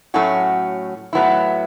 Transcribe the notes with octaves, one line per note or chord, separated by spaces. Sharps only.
A2 F#3 A3 C#4 F#4
A2 F#3 B3 E4